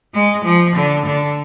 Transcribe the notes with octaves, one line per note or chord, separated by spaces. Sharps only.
G#3
F3
D3
D3